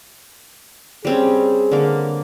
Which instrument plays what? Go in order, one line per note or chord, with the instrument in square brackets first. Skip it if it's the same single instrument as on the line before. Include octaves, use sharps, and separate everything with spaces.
[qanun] G3 C4 C#4 [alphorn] G#4
[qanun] D3 A#3